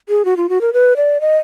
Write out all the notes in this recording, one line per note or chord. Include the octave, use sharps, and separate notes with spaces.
G#4
F#4
F4
F#4
A#4
B4
D5
D#5